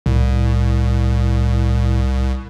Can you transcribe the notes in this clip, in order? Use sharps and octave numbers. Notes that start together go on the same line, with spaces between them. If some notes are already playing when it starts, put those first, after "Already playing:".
C2 A2